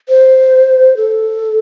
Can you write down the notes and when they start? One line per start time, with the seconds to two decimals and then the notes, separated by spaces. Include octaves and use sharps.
0.09 C5
0.97 A4